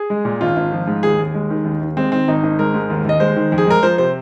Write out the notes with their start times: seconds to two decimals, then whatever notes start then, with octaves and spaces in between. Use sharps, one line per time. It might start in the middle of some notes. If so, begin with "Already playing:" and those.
Already playing: G#4
0.10 G#3
0.25 A#2
0.41 G#1 F4
0.56 G#1
0.72 F3
0.87 G#2
1.03 D#2 G#4
1.19 D#2
1.34 G#3
1.50 D#3
1.65 D#2
1.81 D#2
1.97 G#3 C4
2.12 D#3 C4
2.28 G#1 D#4
2.43 G#1
2.59 G#3 A#4
2.74 G#2
2.90 D#2
3.05 D#2 D#5
3.20 G#3 C5
3.36 D#3
3.52 F2
3.58 G#4
3.67 G#3 A#4
3.83 F3 C5
3.98 C3 C5